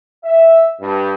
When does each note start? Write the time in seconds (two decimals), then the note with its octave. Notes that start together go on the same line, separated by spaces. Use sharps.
0.24 E5
0.81 G2